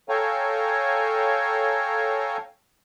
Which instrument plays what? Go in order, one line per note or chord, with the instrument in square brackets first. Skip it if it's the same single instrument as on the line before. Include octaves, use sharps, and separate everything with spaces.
[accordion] A4 C#5 F5 G5 G#5 A#5